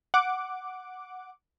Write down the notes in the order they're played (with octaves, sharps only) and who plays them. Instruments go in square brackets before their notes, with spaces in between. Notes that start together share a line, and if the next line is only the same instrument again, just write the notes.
[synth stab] F#5 D6